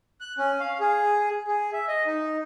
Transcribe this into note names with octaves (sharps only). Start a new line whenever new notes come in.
F#6
C#4
F5
G#4
G#4
E5
D#5
D#4